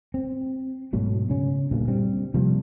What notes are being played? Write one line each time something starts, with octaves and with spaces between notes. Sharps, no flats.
C4
G#2 B2 F#3 A3
C#3 C#4
D2 G2 A#2
G3 C4
C3 F3 G3 A#3